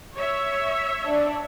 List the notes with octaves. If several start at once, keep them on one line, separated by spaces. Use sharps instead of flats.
C#5 E5
D4